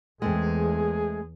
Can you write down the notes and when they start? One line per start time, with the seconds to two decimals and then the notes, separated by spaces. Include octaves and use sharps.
0.22 E2 G#3 A3 C4 G#4